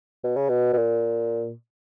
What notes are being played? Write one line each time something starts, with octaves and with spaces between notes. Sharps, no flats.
B2
C#3
B2
B2
A#2